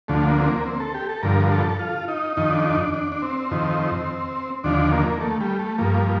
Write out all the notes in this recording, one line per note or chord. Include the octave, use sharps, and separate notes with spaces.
D2 D3 F3 A3
A#3
C4
A#3
C4
A4
G4
A4
G2 D3 F3 A#4
A4
F4
D#4
F2 D#3 D#4
D4
D4
D#4
D4
D4
D4
C4
F2 D#3
D#2 D3 F3 D4
A#3
A3
G3
A3
G2 F3 A#3